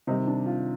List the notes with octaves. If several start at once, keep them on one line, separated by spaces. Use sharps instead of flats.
C3 D#3 G3 D#4
D4
F4